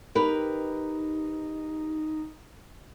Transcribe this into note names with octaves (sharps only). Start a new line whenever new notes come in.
D#4 G4 A#4 B4